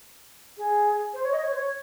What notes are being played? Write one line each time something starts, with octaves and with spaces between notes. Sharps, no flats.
G#4
C5
C#5
D#5
C#5
C5
C#5